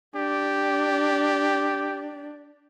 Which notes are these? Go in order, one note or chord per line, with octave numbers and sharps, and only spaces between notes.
D4 G4